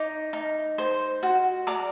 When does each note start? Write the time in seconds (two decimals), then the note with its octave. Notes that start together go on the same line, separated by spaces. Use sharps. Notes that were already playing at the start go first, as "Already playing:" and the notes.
Already playing: D#4 A#5 D6
0.33 D#4
0.78 C5
1.23 F#4
1.67 D5 A#5 D6